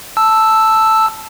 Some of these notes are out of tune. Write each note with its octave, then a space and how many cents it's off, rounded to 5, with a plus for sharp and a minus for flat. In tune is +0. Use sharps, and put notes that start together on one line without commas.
A5 +0 E6 +0